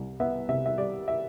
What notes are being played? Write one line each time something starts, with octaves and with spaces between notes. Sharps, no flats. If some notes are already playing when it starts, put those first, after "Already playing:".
Already playing: C2 G3
B3 E5
C3 E5
E5
G3 D5
E5